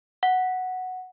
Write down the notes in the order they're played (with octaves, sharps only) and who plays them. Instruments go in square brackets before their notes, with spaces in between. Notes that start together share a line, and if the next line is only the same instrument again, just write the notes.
[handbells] F#5